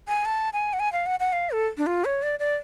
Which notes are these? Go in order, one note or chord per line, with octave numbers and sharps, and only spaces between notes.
G#5
A5
G#5
F#5
G#5
F5
F#5
F#5
F5
A4
D4
F4
C#5
D5
D5